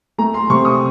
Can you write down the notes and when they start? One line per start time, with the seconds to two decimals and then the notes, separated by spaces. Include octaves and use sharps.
0.18 A3 A#5
0.34 C6
0.50 C3 C#6
0.65 D#6